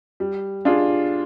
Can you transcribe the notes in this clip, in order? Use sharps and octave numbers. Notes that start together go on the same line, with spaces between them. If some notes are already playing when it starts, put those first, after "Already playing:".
G3
D4 F4 G#4